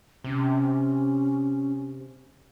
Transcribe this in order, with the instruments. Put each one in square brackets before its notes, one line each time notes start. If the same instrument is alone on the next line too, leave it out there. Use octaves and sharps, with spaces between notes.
[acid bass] C3 [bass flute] C#4